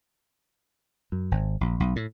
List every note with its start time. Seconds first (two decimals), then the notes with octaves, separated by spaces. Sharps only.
1.12 F#2
1.31 G#1
1.61 A#1
1.80 B1
1.96 A2